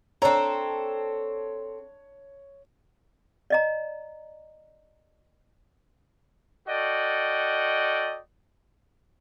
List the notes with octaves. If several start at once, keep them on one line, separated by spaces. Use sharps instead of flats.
C4 D4 A4 C#5 A#5
D5 D#5 A#5
F#4 A4 D5 D#5 G5